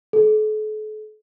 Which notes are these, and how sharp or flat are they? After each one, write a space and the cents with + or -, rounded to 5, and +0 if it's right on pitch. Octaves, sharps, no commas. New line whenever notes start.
A4 -40